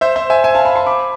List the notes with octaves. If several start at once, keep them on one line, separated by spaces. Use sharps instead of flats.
C5 E5
C5 E5
E5 G#5
E5 G#5
F5 A5
G#5 B5
A5 C6
B5 D6